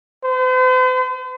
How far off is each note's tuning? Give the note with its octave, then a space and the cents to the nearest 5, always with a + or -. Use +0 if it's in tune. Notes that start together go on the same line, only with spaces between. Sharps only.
C5 -45